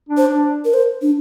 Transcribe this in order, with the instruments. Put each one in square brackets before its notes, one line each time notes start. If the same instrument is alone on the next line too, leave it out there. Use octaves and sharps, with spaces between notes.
[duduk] D4
[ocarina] C5
[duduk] D4
[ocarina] A#4
C5
D4